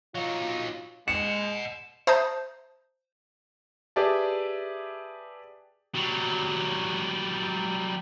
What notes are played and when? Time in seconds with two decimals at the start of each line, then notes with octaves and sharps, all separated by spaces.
0.15 F#3 D#4 F4
1.08 G#3 D#5 F#5 C#7 E7
2.07 C5 E5 A5 A#5 D#6 G6
3.96 G4 G#4 B4 D5 E5 A5
5.95 F#3 G3